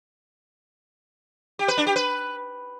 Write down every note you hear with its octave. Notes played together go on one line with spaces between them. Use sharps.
G4
B4
D4
G4
B4